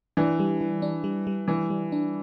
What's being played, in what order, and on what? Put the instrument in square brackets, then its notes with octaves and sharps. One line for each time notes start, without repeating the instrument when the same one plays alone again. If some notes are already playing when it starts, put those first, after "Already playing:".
[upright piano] E3 [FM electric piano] D4
[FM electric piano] G3
E3
D4
G3
G3
[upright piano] E3 [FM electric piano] D4
[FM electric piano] G3
D4